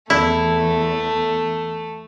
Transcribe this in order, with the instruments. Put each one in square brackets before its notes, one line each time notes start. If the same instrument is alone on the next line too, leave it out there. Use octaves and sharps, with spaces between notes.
[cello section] E2 [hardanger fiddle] A3 [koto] E4